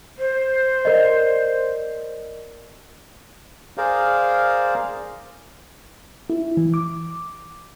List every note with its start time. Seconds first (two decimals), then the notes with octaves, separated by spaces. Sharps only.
0.18 C5
0.85 A#4 D5 D#5
3.78 G#4 A#4 C5 D5 F5
6.30 E4
6.57 E3
6.74 D6